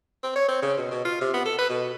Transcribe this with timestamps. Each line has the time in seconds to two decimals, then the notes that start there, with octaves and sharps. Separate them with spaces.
0.23 C4
0.36 C#5
0.48 C4
0.62 C#3
0.77 B2
0.91 B2
1.05 F4
1.21 C3
1.34 B3
1.45 A4
1.58 B4
1.69 B2